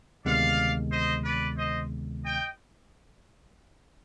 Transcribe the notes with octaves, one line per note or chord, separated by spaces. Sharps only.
D2 C3 D#3 G#3 B3 D5 F5
C5 D#5
B4 D5
C5 D#5
D#5 G5